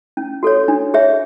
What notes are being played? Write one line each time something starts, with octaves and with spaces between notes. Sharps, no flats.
C#4
F#4 A4 C#5
D4
G#4 C#5 E5